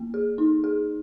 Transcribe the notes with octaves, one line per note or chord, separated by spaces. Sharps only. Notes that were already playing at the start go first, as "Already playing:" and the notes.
Already playing: A#3
G#4
D#4
G#4